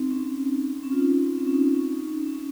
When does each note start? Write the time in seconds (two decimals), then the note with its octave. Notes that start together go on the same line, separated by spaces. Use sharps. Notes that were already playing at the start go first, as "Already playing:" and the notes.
Already playing: C4 D#4
0.11 C#4
0.73 C4
0.83 C#4
0.92 F4
1.00 D#4
1.19 C4
1.36 C#4
1.47 C#4
1.54 D#4
1.72 C#4
1.90 D#4
2.08 C#4
2.26 C#4